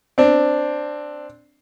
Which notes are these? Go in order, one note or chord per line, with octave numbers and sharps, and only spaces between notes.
C4 D4